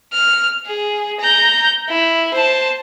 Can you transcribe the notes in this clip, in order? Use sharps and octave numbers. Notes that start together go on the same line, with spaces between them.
F6
G#4
A#5 G6
E4
C5 A5